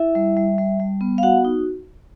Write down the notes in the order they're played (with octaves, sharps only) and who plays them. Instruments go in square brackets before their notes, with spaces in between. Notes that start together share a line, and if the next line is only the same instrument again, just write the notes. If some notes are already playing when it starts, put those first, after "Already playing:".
Already playing: [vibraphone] E4 E5
G3
G3
G3
G3
B3
F5
F#4 F#5
D#4